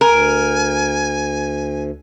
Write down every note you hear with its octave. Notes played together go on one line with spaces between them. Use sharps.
D2 A#4 G#5